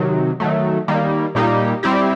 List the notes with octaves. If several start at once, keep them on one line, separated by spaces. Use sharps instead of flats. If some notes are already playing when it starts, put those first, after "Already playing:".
Already playing: C3 D#3 F#3
D#3 F#3 A3
D#3 G3 A#3
A#2 G3 A#3 D#4 G4
G3 C4 E4 G4